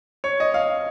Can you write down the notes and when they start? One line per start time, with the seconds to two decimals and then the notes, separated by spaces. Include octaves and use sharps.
0.24 C#5
0.40 D#5
0.54 F5